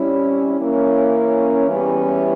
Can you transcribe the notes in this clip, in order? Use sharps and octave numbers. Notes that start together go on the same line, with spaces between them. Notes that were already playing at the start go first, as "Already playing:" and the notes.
Already playing: C3 G3 C#4 E4
E3 A#3 C#4
E2 E3 G3 C#4 E4